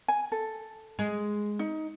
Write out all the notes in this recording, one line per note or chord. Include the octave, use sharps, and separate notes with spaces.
G#5
A4
G#3 G#4
D#4